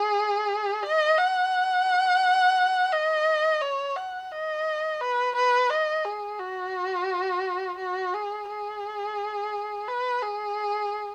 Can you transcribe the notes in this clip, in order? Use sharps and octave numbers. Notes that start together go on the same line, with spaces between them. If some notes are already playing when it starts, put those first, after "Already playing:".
Already playing: G#4
D#5
F#5
D#5
C#5
F#5
D#5
B4
B4
D#5
G#4
F#4
F#4
G#4
G#4
B4
G#4